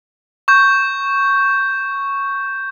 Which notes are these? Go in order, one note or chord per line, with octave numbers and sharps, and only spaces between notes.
C#6 G6